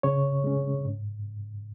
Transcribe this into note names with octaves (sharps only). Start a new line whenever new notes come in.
C#3 C#5
G#3 C#4
G#2